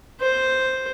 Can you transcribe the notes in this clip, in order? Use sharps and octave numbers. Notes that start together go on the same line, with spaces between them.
C5